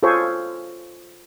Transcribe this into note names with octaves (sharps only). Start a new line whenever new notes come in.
F4 G#4 A4 C5 C#5